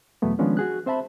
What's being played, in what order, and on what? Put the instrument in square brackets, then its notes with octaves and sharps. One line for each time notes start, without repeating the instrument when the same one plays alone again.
[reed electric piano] E2 B2 F#3 A3 B3
D#3 F3 G#3 B3 C#4 D4
F#4 G#4 F#6
C4 C5 E5 A5 B5